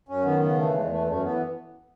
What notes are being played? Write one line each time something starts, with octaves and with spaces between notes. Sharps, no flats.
F#2 C#4
D#3 B3
C#3 B3
E3 A3
E2 G#3
G#3
E3 A3
F#2 A3
E3 B3